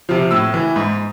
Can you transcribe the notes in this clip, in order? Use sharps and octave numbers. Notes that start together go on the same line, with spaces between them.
C3 F3
A2 E6
E3
G#2